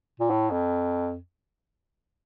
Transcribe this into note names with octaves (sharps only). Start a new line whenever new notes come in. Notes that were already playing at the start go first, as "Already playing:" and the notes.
A#2
A2
F2